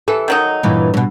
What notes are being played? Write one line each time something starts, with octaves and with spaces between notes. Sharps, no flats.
E3 A4
D#3 F#3 D#4
G2 A#2 E3
F2 B2